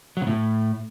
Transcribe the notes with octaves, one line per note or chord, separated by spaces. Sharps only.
F#3
C#3
A2